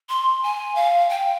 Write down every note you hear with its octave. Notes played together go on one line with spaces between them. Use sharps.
C6
G#5
F5
G5